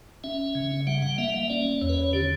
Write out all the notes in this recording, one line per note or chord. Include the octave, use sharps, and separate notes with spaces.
C#4 E5
C#3
G3 F#5
F#5
A#3 E5
E5
C#4 D5
E2 C#5
B4
C#5
D3 G4